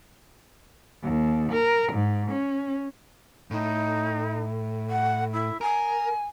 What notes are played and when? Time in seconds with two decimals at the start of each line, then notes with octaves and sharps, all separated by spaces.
1.03 D#2
1.52 A#4
1.92 G#2
2.31 C#4
3.51 A2 D#4
4.90 F#5
5.33 E4
5.61 A#4 G#5